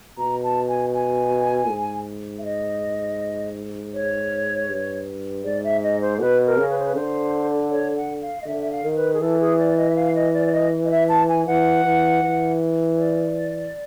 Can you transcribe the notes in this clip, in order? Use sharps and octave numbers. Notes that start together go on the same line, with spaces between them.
B2 A#5
A5
G#5
G#5
G#2
E5
D#5
C#5
G2
G#2 D5
E5
D#5
C5
B2 B4
A#4
C#3
B4
C5
B4
D3 C5
C#5
F#5
F5
D#5
D3 E5
E5
F5
D#3
B4
G#4
E3 A4
G#4
D5
D#5
E5
F5
D#5
D5
D5
D#5
D#5
E5
A5
G#5
E3 F#5
E3
E3
D5